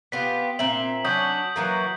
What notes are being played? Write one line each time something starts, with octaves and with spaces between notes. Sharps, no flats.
B3 F4 G4 B6
A#2 C4 E5 F#7
F#3 C#4 D4 D#6 G6 B6
E3 F#3 A#3